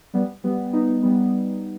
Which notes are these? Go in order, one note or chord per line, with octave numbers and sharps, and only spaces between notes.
G3 B3
G3 B3
B3 D#4
G3 B3